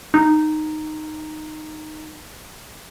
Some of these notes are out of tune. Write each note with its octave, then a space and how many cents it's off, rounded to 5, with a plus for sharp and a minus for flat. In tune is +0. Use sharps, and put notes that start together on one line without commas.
D#4 -10